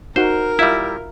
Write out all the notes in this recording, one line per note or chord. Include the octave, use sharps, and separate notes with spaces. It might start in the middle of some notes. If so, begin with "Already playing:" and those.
D#4 F#4 A#4 C5 F#5
G3 E4 F4 E5